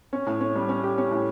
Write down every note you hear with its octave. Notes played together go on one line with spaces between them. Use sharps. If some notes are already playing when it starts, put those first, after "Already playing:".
C#4
A2
C#4
G3
C#4
G4
C#4
A2